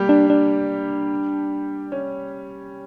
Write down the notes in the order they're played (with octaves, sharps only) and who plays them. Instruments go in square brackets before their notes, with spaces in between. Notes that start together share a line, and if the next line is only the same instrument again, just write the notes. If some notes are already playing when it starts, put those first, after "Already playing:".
Already playing: [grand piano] G3 A#3 G4
[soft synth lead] D4
D4
[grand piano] C#4